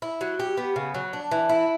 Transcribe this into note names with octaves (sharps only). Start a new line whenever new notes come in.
E4
F#3
G4
B3
C#3
F#3
D4
E3
E4